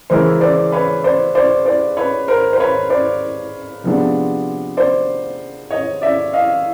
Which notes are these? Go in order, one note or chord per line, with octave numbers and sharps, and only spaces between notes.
C#3 E3 G#3 C#4 E4 A#4 C5
C5 D5
B4 C#5
C5 D5
C5 D5
C5 D5
B4 C#5
A#4 C5
C5
B4 C#5
C5 D5
C3 F3 G#3 B3 D4
C5 D5
C#5 D#5
D5 E5
D#5 F5